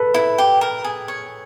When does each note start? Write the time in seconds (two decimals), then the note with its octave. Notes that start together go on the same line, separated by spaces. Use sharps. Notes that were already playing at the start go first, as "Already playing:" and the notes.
Already playing: A4 B4
0.14 E4
0.38 G4
0.61 A#4
0.84 G#4
1.08 C#5